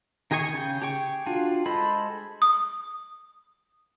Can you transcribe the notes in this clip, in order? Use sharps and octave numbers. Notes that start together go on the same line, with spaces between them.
D#3 G4 G#4 G#5 C#6
C#3 G5
G4 G#4 G5 C#6
D4 F4 F#4
G#3 A4 C5 B5
D#6